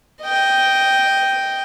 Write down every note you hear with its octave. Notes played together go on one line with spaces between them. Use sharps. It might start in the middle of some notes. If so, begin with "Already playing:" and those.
D#5 G5